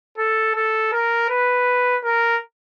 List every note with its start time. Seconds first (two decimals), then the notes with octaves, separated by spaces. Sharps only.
0.18 A4
0.55 A4
0.93 A#4
1.30 B4
2.05 A#4